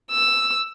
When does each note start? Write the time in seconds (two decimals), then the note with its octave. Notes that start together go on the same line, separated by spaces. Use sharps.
0.12 E6